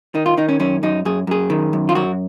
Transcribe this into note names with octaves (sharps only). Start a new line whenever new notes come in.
D#3 D#4
F4
D#3 D#4
C#4
F#2 C#4
F#2 D#4
F#2 G#4
F#2 G#4
D#3
F#2
F4
F#2 F#4